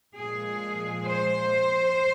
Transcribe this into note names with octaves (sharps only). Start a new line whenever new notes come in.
A#2 F3 G#3 G#4
C5